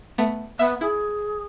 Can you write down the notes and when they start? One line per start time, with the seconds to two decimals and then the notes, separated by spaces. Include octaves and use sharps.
0.18 A3 B3
0.59 B3 E5
0.81 E4 G#4